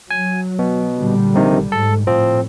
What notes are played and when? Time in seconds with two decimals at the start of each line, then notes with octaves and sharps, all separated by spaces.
0.11 F#3 G#5
0.59 B2
0.97 A#2 D3 G3
1.34 A#1 C3 D#3
1.72 G#2 A4
2.07 A2 F3 C4